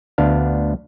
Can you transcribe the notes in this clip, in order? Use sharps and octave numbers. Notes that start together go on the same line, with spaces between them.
D2 B3 D4 F5